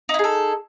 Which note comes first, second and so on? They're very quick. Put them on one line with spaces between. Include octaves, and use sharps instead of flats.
D#4 E4 G#4 A4